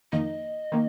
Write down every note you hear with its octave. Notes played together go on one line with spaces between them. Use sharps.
F2 D#3 A#3 D#4 D#5
D#3 A#3